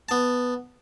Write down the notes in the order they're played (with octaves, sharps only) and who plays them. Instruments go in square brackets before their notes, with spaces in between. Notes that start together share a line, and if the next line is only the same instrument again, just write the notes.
[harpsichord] B3 A5